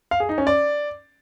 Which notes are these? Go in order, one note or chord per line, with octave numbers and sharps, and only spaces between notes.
F5
G#4
D#4
C#4
D5